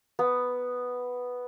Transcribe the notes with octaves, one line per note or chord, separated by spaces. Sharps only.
B3